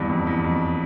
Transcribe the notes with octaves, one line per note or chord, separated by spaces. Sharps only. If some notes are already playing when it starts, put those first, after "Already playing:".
Already playing: E2 G2
F2
E2
F2